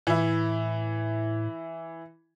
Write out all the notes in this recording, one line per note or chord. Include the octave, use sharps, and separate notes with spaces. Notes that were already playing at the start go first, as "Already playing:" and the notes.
A2 E3 E4